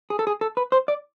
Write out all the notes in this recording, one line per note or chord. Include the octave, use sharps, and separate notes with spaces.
G#4
A4
G#4
A4
B4
C5
D5